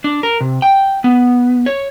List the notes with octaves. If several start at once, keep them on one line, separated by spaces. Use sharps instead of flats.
D4
A#4
C3
G5
B3
C#5